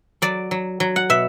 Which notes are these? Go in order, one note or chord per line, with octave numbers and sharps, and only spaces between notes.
F#3 D5
F#3
F#3
F#5
B2 E5